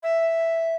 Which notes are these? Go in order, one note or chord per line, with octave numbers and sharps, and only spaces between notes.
E5